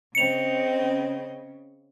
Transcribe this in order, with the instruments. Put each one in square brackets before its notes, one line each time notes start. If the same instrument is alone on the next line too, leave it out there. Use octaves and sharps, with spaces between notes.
[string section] C#3 [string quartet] C4 D#5 [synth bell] C#7 F7